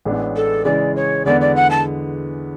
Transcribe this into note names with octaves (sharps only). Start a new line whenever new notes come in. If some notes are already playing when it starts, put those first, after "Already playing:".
A1 A2 G#3 B3 D4
A4
C#3 E3 G#3 D5
C#5
E2 D3 G#3 B3 D5
D5
F#5
A5